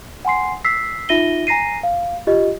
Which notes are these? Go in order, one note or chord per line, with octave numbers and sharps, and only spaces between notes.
F#5 G#5 C6 C7
E6 B6 C7
D#4 F4 E5 A#6 D#7 G7
G#5 A#5 A#6 C7 D#7
F5
F4 G4 D#5